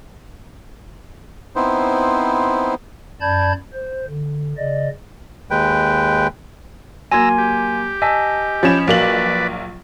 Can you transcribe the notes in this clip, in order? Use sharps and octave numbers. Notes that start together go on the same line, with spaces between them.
B3 C4 D#4 E4 C5
F#2 D5 A5 B5 G6 G#6
C5
D3
C#3 D5 D#5
D#2 G#3 B4 G5
F#3 A#3 G#5 A#5 C6 E6 G#6
G4
D#5 G#5 A5 E6 B6
F3 C#4 B5 G#6 A6 E7
A#1 F#3 A#3 B4 D5 F#7